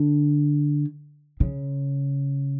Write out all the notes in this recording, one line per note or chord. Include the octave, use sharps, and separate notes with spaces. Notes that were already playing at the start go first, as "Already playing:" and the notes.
Already playing: D3
C#3